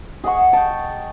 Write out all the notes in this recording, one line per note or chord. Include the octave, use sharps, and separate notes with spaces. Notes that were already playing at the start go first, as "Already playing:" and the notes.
G#4 D#5 F#5 C#6
G5 A5